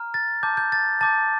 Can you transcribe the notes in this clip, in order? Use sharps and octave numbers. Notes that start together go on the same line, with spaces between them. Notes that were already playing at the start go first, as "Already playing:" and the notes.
Already playing: A#5 F6
A6
A5 D6 G6
G6
A6
A5 D6 G6 A6